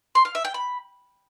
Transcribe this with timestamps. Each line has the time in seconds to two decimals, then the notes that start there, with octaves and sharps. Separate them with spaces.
0.15 C6
0.25 F5
0.35 E5
0.45 G5
0.54 B5